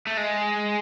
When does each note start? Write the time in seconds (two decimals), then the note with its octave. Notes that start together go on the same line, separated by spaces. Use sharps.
0.07 A3
0.17 G#3